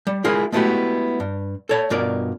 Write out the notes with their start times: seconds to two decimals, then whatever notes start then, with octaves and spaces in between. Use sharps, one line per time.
0.07 G3
0.24 G#3 E4 F4 G#4 A#4
0.52 G#3 A3 B3 E4 F#4 G4
1.20 G2
1.69 A4 C#5 A5
1.90 G2 B2 F4 A#4 D5